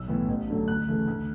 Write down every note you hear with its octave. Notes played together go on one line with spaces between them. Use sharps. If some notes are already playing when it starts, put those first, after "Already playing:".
Already playing: B1 E6
A2 E3 B3
A1
G2 D3 F#3 A3
D2 F#6
C#3 E3 A3
D2